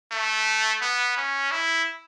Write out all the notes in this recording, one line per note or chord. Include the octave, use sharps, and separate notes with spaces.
A3
B3
C#4
E4